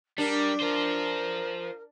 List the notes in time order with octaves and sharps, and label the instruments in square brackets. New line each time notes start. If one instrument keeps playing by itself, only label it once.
[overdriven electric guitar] G3 [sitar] D4 [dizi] A#4
[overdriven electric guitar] F4 C5 [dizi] A#4